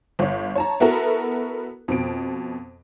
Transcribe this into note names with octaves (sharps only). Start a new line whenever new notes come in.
G1 C#5
C#5 A5 A#5
B3 E4 F#4 A4 A#4
F2 B2 D7